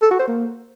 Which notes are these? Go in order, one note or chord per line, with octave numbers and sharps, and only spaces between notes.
A4
F#4
C5
A#3